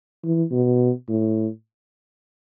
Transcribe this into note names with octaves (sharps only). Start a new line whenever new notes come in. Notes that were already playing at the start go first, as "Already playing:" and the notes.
E3
B2
A2